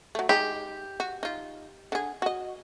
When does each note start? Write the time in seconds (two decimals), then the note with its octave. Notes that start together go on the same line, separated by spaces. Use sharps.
0.15 F#3 A3
0.29 G#3 D#4 G4 G#4
1.00 F#4
1.23 D#4 F4
1.92 D3 G#4
2.22 F#4 D#5